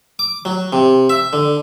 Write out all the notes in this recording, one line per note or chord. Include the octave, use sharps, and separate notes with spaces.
D6
F#3
C3
E5
D3